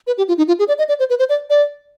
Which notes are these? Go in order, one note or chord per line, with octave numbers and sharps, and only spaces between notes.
B4
G4
F4
D#4
F4
G#4
D5
D#5
D5
C5
B4
C5
D5
D5